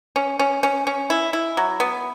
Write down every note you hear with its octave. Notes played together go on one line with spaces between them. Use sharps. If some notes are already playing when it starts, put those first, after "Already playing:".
C#4
C#4
C#4
C#4
E4
E4
F#3
B3